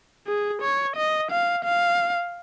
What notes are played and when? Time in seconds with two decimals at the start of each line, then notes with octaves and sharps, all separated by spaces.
0.27 G#4
0.62 C#5
0.96 D#5
1.31 F5
1.65 F5